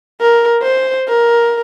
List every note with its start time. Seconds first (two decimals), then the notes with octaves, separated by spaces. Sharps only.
0.21 A#4
0.62 C5
1.08 A#4